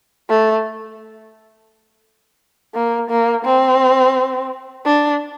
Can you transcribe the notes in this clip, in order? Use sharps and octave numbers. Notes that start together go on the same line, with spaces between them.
A3
A#3
A#3
C4
D4